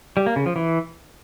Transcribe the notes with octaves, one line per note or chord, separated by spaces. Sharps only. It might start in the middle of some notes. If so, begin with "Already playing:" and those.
G3
A#3
C#3
F3
E3